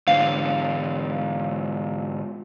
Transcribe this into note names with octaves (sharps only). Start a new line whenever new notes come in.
G#2 D3 F5